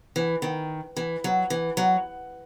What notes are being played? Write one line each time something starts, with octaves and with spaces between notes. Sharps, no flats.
E3
D#3
E3
F#3
E3
F#3